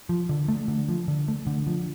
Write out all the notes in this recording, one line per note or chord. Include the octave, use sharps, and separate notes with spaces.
F3
D3
A3
D3
F3
D3
A3
D3
F3